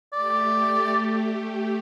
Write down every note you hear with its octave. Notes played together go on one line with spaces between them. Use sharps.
A3 G4 D5